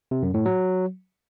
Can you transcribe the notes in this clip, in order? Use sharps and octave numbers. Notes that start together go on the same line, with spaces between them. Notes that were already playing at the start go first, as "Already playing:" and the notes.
C3
F#2
A2
F#3